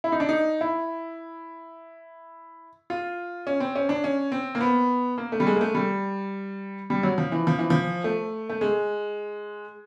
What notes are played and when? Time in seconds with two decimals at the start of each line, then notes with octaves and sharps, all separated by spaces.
0.04 E4
0.12 D#4
0.20 D4
0.29 D#4
0.61 E4
2.90 F4
3.47 C#4
3.60 C4
3.75 C#4
3.89 D4
4.04 C#4
4.32 C4
4.55 A#3
4.60 B3
5.18 A#3
5.32 A3
5.40 G3
5.47 G#3
5.56 A#3
5.61 A3
5.75 G3
6.90 G3
7.03 F#3
7.18 F3
7.32 E3
7.47 F3
7.59 E3
7.70 F3
8.04 A3
8.50 A3
8.61 G#3